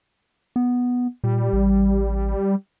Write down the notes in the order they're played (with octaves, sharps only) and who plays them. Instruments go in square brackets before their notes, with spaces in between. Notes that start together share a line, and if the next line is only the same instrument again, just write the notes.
[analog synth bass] B3
[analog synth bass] A#2 [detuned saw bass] G3
[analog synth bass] A1